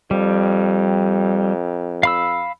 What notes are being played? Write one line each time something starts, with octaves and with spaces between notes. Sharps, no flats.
F2 G3
F5 B5 E6